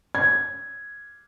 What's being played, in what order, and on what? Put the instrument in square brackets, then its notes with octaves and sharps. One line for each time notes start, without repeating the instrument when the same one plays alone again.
[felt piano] G#6